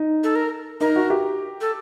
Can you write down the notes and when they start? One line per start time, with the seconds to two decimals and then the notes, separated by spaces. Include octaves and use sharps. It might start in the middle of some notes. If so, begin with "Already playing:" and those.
Already playing: D#4
0.24 A4
0.35 A#4
0.81 D#4 A#4
0.96 F#4
1.10 G4
1.61 A4